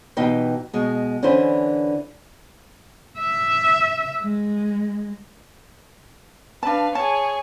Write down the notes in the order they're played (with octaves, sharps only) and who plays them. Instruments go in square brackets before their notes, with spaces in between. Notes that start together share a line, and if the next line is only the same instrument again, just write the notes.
[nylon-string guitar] B2 E3 D#4 G4 G5
B2 G#3
D3 E3 C#4 D4 E4 C5
[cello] E5
G#3
[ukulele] D4 A5 [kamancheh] B4 F5
[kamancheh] G#4 C#5 [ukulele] A5